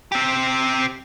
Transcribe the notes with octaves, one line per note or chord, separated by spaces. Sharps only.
C4 G4